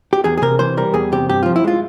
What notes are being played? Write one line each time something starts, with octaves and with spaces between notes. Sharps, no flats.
G4
E2 G#4
G#4
C3 A#4
E3 C5
G3 A#4
E2 G#4
C3 G4
G2 G4
F3 F4
E4
G#3 F4